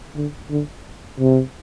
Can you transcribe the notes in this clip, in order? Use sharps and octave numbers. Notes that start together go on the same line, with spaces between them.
D3
D3
C3